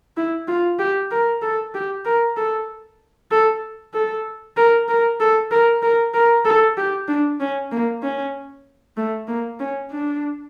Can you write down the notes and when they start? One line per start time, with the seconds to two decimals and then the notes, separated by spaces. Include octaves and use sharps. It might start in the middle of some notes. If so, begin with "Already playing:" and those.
0.17 E4
0.48 F4
0.79 G4
1.11 A#4
1.42 A4
1.74 G4
2.05 A#4
2.37 A4
3.31 A4
3.94 A4
4.57 A#4
4.88 A#4
5.20 A4
5.51 A#4
5.82 A#4
6.14 A#4
6.45 A4
6.77 G4
7.08 D4
7.40 C#4
7.71 A#3
8.03 C#4
8.97 A3
9.28 A#3
9.60 C#4
9.91 D4